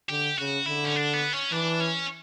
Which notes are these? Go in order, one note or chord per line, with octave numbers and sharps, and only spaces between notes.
D3 G4
C#3 F#4
D3 E4
C#4
D4
B3
C#4
E3 D4
C#4